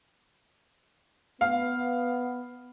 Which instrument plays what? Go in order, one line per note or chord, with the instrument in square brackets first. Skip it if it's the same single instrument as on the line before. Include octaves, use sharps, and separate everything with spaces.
[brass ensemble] B3 [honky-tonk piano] F5